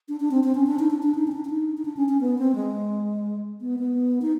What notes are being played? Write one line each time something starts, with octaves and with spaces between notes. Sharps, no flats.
D4
D4
C4
C4
C#4
D4
D#4
D4
D4
D#4
C#4
D4
D4
D#4
D#4
D4
C#4
C#4
B3
C4
G#3
B3
B3
D#4